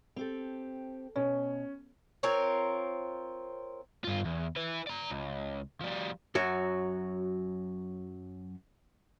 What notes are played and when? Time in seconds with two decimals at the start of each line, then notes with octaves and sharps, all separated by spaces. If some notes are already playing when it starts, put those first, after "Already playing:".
0.16 C4 G4 A4
1.16 B2 C#4
2.23 C4 F4 A#4 C#5
4.04 G2 F4
4.25 E2
4.56 E4 B4
4.87 D5 A#5
5.10 C#2
5.80 F3 G3
6.35 F#2 F#3 F#4